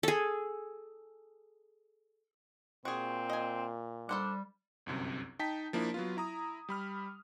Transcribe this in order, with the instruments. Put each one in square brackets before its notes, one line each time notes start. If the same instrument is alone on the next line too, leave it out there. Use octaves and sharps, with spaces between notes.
[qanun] G#4 A4
[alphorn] A#2 [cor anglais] C4 [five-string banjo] F#4 G#4
[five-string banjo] D#5 G#5
[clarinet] G3 [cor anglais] D4 [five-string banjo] A4 C5 F#5
[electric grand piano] G1 C2 F#2 C3
D#4 G5 A5 B6
F3 A#3 D4 E4 D5
F#3 B3 F4
E4 A#5 D#6
G3 B5 F6